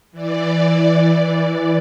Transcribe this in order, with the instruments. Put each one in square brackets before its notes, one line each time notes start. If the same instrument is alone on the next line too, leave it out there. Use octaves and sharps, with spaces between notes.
[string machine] E3 D5